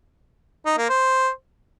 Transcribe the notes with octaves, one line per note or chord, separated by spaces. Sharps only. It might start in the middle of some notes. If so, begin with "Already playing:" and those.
D#4
A#3
C5